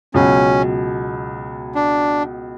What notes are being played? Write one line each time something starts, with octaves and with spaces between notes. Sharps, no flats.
C#2 B2 F#3 C#4
D4